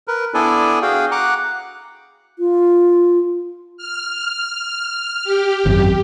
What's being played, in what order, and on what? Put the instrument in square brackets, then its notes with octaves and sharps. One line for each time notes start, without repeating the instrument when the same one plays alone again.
[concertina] A#4 B4
B3 D4 E4 A4 D5 G#5
F#4 G#4 F5 G5
F#5 A#5 D6 F#6
[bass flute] F4
[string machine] F6
G4
[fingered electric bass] G#1 F#2